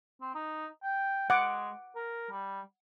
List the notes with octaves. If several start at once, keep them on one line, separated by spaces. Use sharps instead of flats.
C4
D#4
G5
G#3 F#5 D6
A#4
G3